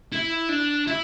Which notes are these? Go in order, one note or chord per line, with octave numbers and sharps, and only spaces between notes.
E4
D4
E4